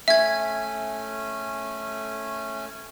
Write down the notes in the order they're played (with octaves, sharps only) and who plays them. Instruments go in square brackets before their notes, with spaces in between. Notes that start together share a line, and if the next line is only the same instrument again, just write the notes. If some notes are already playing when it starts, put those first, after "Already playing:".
[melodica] A3 C#4 G#5 [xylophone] E5 G#6